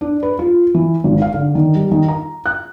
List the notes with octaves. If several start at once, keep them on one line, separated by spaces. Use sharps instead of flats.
D4
B4
F4
E3
G#1
F5
D3
D#3
G3
D#3
A#5
F#6